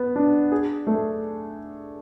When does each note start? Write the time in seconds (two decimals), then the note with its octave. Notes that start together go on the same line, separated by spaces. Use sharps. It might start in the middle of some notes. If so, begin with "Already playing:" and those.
Already playing: B3
0.16 D4
0.52 G#4
0.87 A3